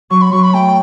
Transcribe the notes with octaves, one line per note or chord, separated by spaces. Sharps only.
F#3 C#6
B5
F#3 C#6
B5
A3 G5